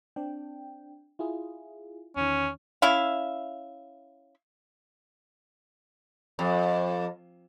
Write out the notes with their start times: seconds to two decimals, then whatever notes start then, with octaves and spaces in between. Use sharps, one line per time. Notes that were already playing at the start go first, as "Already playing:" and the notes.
0.16 C4 D4 G5
1.19 E4 F4 G#4
2.16 E2 D#3 C#4
2.82 C#4 E4 E5 F5
6.39 F2